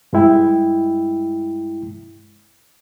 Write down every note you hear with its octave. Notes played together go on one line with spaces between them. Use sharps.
G2 G#3 E4 G5